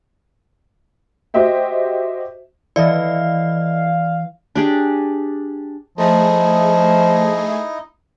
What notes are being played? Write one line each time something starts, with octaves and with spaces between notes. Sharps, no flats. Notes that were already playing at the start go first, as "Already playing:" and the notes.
F#4 G4 C5 D#5 E5 G5
E3 E4 A4 D5 D#5 F5
D4 G4 G#4
F3 A3 D#4 E4 G#4 D#5